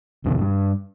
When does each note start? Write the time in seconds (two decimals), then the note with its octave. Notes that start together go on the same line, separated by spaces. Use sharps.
0.24 A#1 E2 B2 D3
0.38 G2